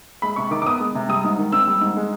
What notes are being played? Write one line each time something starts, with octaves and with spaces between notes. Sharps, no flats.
G#3 B5
C3 C#6
D#3 D6
D6
B3 D#6
G#3
C3
G3 D#6
G#2
D#3
C4 E6
G3
G#2
G#3